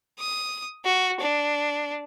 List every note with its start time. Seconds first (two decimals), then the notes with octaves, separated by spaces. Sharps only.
0.19 D#6
0.85 F#4
1.20 D4